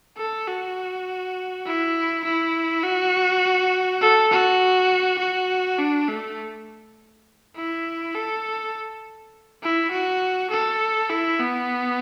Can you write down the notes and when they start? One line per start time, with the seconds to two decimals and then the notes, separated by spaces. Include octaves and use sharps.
0.17 A4
0.47 F#4
1.65 E4
2.25 E4
2.83 F#4
4.01 A4
4.31 F#4
5.19 F#4
5.79 D4
6.08 A3
7.56 E4
8.15 A4
9.62 E4
9.91 F#4
10.50 A4
11.09 E4
11.39 B3